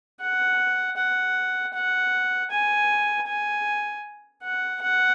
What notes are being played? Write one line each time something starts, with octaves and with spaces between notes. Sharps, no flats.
F#5
F#5
F#5
G#5
G#5
F#5
F#5